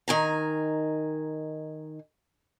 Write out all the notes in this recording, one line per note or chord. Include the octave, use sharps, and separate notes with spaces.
D#3 G#5 A#5